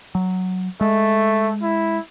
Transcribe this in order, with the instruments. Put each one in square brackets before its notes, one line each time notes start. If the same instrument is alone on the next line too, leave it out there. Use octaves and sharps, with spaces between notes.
[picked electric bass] F#3
[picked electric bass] G#3 [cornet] A3
[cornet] E4